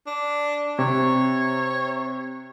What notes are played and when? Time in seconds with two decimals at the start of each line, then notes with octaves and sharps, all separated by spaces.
0.07 D4
0.79 C3 C#5